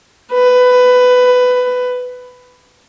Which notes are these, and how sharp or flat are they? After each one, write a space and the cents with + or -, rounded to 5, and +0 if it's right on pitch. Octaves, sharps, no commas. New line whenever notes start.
B4 +15